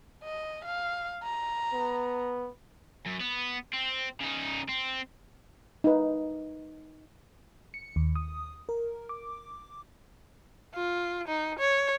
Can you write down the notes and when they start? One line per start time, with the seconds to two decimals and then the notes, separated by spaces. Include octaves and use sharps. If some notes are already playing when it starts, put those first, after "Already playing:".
0.24 D#5
0.65 F5
1.23 A#5
1.73 B3
3.06 F#2
3.21 B3
3.73 C4
4.21 C#3 D#4
4.69 C4
5.84 D#4 B4
7.74 C#7
7.96 D#2
8.16 D#6
8.69 A#4
9.09 D6
10.75 F4
11.28 D#4
11.59 C#5